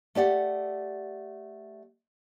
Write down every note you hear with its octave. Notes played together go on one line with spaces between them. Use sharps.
A3 G4 D5 F#5